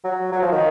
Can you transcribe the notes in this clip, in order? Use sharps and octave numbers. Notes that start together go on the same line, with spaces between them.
F#3
F#3
F3
D#3